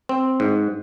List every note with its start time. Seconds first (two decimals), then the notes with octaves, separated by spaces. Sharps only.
0.09 C4
0.40 G#2